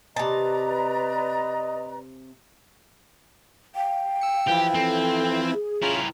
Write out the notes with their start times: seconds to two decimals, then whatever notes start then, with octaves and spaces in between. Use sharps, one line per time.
0.16 C3 B4 D5 D#5 A5 A#5
3.76 F5 G5
4.21 E6 C#7
4.48 E3 F3 E4 G4
4.75 C4 A4
5.53 G#4
5.82 C#4 E4 F4 A#4